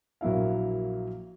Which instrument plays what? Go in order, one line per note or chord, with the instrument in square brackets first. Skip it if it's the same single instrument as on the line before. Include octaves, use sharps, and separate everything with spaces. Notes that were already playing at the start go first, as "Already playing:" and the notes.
[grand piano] A#1 F#3 A#3 E4 F5